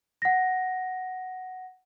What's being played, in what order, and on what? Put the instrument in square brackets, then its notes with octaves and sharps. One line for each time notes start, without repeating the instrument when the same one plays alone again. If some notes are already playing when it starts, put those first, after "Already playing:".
[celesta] F#5 A#6